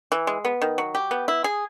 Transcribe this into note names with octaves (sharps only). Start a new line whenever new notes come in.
E3
G#3
B3
D#3
F#3
G4
B3
E4
G#4